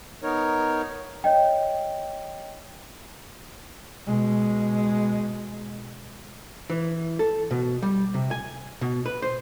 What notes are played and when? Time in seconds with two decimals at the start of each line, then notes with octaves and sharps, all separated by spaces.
0.23 B3 D#4 A#4 C#5
1.24 C#5 D#5 G5
4.07 B2 G#3
6.70 E3
7.19 A4
7.51 B2
7.82 G3
8.14 C3
8.31 G#5
8.81 B2
9.06 B4
9.22 C5